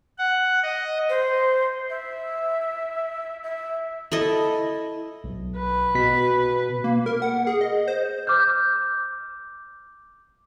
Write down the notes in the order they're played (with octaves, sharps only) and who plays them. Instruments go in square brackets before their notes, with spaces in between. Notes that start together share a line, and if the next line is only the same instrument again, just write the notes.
[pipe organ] F#5
D#5
[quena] C5
E5
E5
[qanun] E4 A4 D#5
[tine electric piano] B1
[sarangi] B4
[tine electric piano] B2 B6
[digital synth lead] A#3
A#4
F#5
G#4
D#5
C5
[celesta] D6 F6 G6